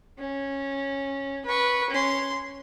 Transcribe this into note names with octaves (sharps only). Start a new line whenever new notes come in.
C#4
B4 C#6
C#4 C6